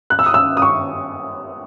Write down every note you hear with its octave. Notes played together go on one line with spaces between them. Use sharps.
F#6
E6
D#6
E6
D#6
C#6